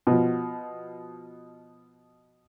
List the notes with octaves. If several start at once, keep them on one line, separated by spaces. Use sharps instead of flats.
B2 F3